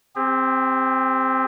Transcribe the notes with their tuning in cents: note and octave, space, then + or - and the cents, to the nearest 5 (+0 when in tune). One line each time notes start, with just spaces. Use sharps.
C4 +0 G4 +45